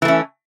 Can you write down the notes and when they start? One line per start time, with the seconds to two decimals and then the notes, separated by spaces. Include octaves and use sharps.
0.02 E3
0.05 A3
0.08 C#4